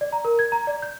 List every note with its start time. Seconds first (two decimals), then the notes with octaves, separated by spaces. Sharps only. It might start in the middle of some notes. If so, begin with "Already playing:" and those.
0.01 D5
0.13 A#5
0.25 A#4
0.39 G#6
0.52 A#5
0.67 D5
0.82 G6